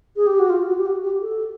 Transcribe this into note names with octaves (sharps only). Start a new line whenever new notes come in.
G#4
G4
F#4
F4
F#4
G4
F#4
G4
A4